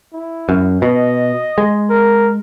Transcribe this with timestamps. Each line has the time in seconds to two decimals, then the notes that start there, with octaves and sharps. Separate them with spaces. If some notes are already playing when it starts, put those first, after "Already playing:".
0.13 E4
0.49 F#2
0.82 B2 D#5
1.58 G#3
1.90 A#4